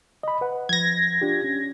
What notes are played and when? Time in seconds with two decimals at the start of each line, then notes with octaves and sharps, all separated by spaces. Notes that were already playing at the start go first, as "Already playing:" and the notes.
0.23 D#5 B5
0.41 B4 F#5
0.69 F3 G#6 A#6
1.21 D4 F4 G4
1.44 C#4